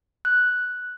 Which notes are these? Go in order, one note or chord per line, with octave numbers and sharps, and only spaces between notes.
F#6